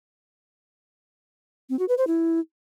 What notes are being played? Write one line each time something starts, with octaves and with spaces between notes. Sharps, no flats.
C4
F#4
B4
C5
E4